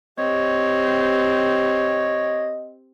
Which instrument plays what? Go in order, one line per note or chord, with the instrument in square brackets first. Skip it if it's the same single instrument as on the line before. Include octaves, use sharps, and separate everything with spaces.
[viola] C4 G4 [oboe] C#5 [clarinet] D#5